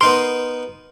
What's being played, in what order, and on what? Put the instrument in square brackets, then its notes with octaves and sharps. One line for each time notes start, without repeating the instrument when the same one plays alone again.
[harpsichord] B3 D#4 A#4 [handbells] C6